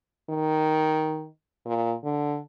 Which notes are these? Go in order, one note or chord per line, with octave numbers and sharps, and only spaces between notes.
D#3
A#2
D3